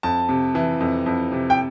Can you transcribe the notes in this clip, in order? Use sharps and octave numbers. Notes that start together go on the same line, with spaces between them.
F2 A5
C3
E3
F2
F2
C3
G5